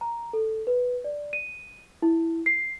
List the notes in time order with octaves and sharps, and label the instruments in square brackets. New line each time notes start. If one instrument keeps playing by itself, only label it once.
[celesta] A#5
A4
B4
D5
D#7
E4
C7